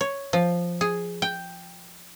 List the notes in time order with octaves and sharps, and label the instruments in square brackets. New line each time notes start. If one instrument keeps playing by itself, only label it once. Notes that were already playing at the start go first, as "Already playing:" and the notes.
[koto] C#5
F3
G#4
G5